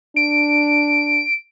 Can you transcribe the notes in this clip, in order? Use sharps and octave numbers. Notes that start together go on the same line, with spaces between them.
D4 D7